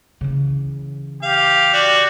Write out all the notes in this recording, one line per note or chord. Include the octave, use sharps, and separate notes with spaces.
C#3 E3
G4 F5
F#4 D5